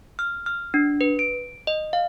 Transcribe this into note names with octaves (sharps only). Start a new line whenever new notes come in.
F6
F6
D4
B4
D7
D#5
F5